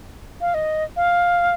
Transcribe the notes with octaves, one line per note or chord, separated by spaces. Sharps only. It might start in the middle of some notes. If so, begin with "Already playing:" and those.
F5
D#5
F5